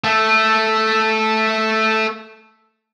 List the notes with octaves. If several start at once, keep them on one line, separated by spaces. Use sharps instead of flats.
A3 A4